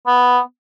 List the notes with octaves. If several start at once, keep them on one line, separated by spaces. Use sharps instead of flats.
B3